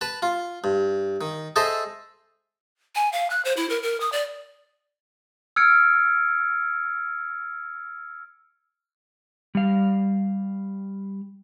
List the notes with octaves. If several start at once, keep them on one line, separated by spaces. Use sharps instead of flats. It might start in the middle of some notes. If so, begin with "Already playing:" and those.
B4 A5
F4
G2
D#3
G#4 A4 C5 D#5 E5 A5
G#5
F5
F#6
C5
E4
A#4
A#4
D#6
D5
E6 F6 G#6 C#7 D7
G3 F5